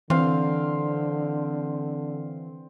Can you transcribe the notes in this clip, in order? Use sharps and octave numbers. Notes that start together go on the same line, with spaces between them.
D3 E3 C4 F5